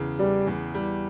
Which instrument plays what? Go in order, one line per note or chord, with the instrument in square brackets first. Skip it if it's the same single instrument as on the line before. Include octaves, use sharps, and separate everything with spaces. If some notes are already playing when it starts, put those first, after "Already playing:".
Already playing: [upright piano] E2 C#3
[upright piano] E3 [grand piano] G3
[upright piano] E2
G3